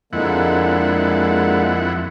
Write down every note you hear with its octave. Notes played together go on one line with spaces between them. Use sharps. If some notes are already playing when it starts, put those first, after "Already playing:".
F2 D3 G#3 A#3 E4 F#5